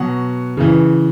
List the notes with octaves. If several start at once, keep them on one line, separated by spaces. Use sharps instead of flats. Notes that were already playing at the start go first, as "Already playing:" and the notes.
Already playing: B2 F#3 F#5
C#3 E3